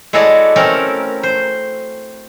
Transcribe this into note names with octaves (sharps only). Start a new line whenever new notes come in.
G#3 E4 F#4 A4 C#5 D5
A3 C4 C#4 A4 A#4
C5